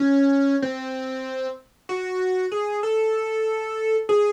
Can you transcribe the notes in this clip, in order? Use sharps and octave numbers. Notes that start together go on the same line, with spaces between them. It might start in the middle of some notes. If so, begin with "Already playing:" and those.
Already playing: C#4
C4
F#4
G#4
A4
G#4